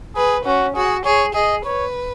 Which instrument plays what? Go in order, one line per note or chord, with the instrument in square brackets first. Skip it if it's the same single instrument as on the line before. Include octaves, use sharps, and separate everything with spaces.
[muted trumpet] G#4 [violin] B4
[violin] C#4 [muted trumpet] F#4
[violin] F#4 [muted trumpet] G#4
[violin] G#4 [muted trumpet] C#5
[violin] G#4 [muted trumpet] D#5
[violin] B4 [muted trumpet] C#5